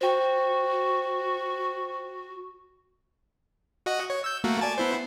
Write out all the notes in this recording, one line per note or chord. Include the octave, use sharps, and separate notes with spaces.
F#4 C5 G5
F#4 D#5 F#5
C#5
E6 G6
A3 A#3 F#4
D5 G#5 A5
B3 E4 C5